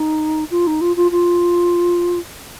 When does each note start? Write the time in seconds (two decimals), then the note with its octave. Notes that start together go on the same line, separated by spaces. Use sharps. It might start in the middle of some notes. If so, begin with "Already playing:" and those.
Already playing: D#4
0.51 F4
0.67 D#4
0.81 F4
0.96 F4
1.11 F4